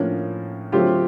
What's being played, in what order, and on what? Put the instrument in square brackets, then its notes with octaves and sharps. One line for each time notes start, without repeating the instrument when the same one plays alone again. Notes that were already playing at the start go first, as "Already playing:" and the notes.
Already playing: [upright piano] A2 F3 A#3 D4 [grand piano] C#4
[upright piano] D3 F#3 A3 C4 [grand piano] F4 G4